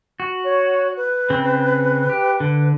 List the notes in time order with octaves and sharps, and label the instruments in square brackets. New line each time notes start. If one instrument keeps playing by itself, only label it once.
[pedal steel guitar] F#4
[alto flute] C#5
B4
[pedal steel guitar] C#3 C4
G4
D3